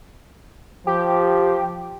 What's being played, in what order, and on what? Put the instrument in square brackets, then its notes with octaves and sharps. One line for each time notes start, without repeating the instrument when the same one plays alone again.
[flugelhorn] F3 [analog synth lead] G4